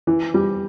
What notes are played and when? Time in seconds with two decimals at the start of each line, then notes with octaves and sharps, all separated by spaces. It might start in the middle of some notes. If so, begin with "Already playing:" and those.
0.07 E3
0.34 G3